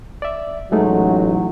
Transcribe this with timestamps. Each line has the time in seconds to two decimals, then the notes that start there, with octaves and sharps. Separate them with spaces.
0.22 D5 E5
0.72 A1 F#3 G#3 A3 D#4